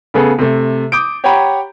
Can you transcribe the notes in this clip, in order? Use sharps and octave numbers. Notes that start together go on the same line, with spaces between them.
C#3 A3 B3 G#4 A4
C3 A3
D6 D#6 G6 D7
G4 C#5 F#5 G5 A#5 B5